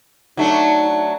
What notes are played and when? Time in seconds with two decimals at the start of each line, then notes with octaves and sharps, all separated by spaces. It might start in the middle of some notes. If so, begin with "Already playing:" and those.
0.37 F#3 A3 D4 D#4